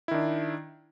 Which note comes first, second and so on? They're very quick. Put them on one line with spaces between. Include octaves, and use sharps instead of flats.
E4 D#3 D4